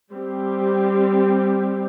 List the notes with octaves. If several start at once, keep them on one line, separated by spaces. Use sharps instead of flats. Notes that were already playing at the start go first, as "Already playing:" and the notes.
G3 C4 G4